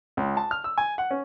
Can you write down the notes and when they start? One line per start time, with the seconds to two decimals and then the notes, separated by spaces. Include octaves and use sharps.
0.17 C#2
0.37 A5
0.51 F6
0.64 E6
0.78 G#5
0.98 F#5
1.11 C#4